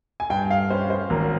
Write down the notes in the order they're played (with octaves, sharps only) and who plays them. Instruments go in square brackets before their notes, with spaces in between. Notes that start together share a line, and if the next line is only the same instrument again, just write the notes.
[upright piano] G#5
[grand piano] G2 [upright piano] G5
[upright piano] F5
[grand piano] C#4 [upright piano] C5
[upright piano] C5
[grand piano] G#1 [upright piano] A#4